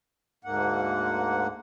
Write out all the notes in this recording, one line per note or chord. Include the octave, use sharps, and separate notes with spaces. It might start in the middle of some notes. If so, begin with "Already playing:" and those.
D2 G#2 A#3 F#5